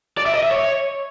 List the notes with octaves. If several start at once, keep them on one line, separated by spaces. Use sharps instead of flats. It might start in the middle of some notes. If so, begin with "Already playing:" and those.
D5
E5
D#5
E5
C#5